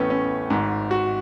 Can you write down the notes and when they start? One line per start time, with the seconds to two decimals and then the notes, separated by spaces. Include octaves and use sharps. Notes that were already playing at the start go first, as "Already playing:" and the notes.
Already playing: A1 A2 A3 B3 C#4
0.10 C#4
0.50 G#1 G#2
0.91 F#4